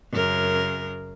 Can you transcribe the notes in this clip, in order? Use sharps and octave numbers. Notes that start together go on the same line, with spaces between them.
F#2 C#3 A#4